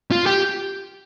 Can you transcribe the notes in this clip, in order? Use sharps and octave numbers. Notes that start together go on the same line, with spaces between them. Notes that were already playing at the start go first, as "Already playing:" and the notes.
F4
G4